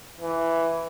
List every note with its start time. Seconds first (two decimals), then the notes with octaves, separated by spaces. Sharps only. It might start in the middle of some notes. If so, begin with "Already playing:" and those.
0.20 E3